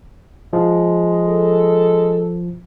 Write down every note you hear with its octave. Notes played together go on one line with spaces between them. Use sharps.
F3 G#3
A4